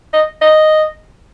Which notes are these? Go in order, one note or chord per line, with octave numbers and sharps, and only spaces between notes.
D#5
D#5